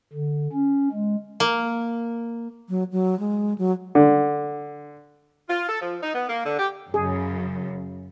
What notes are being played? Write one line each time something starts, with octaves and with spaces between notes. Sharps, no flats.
D3
C#4
G#3
A#3
F#3
F#3
G#3
F#3
D3
F4
A4
F3
D#4
B3
A#3
D3
G4
F#2 C#3 G#4